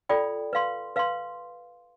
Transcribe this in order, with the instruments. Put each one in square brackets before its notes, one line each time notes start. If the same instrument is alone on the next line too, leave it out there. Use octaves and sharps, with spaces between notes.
[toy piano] F4 A4 D5 G5 B5
B4 F5 C6
B4 F5 C6